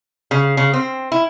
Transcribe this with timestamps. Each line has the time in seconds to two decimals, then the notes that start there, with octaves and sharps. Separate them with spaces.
0.31 C#3
0.57 C#3
0.73 C4
1.12 E4